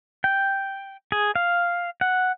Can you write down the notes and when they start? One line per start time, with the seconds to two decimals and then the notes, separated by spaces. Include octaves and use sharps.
0.24 G5
1.12 G#4
1.36 F5
2.01 F#5